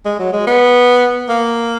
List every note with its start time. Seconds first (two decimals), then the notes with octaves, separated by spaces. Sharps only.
0.05 G#3
0.19 F#3
0.33 G#3
0.47 B3
1.29 A#3